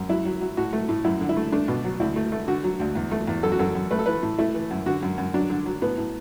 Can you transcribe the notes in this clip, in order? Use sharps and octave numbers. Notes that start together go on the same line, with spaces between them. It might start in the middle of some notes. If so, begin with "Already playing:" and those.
Already playing: F#2
F#3 E4
F#3
F#3
A2 F#4
A3
A2
F#2 E4
D3
E4
A3
A3 D4
B2
F#3
D2 E4
A3
A3
D3 F#4
F#3
D2
E2
A3
E2
F#2 A4
F#4
F#2 A4
F#2
A3 B4
A4
E3 B4
A2
A3 E4
E3
F#2
D3 F#4
F#2
F#2
F#3 D4
D3
F#3
A2 B3
A2